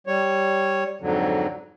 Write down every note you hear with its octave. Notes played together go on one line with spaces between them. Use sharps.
G3 C#5
F2 G#2 D3 F#3